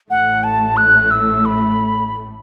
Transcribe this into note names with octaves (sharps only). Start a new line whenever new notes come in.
A1 A2 A3 F#5
A5
F#6
E6
B5